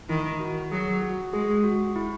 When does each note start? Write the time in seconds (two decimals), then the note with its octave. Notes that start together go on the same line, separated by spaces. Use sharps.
0.09 D#3 E4
0.40 F#4
0.71 F#3 G#4
1.02 F#4
1.33 G#3 G#4
1.64 F#4
1.96 E4